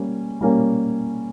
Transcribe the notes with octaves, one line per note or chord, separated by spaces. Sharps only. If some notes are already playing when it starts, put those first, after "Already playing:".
Already playing: G3 A#3 C#4
G3 A#3 C#4